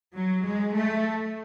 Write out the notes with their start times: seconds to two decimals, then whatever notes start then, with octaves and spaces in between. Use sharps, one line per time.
0.14 F#3
0.45 G#3
0.75 A3